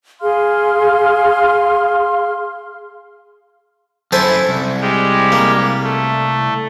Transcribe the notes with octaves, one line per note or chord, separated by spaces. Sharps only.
G#4 F5 C6 F6
F#2 E4 A4 C5 G#5
C2
G3 G#3 G4
A#3
A3